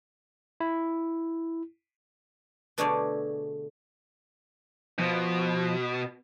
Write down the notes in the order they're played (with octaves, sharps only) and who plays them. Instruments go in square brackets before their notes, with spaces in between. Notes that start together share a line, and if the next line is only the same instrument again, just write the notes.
[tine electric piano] E4
[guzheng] B2 D3 A3 G#4 C#5 D5
[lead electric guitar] B2 [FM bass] F3